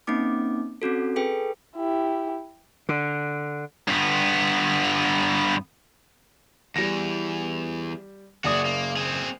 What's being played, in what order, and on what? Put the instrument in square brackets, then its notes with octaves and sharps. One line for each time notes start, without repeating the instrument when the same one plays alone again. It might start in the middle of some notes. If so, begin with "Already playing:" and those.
[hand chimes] A#3 C4 C#4 D#4 D6
C4 C#4 F#4 A4
G#4 A4 B4 G5
[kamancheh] E4 G4
[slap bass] D3
[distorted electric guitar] G2 B3
[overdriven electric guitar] E2 E3 [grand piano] G3 A#6
[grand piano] F#1 D5 D#6 [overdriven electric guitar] F#4 G#4
[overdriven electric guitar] A#3
C4 G#4